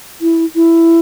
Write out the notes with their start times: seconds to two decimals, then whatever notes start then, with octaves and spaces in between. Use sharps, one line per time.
0.21 E4
0.55 E4